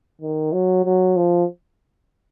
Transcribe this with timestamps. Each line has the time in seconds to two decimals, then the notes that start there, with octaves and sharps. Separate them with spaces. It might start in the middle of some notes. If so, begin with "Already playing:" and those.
0.21 D#3
0.53 F#3
0.85 F#3
1.16 F3